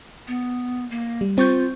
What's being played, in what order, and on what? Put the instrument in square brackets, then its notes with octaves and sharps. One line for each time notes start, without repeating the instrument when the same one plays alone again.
[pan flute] B3
A#3
[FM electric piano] G3
[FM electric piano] C4 C#6 G6 [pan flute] F4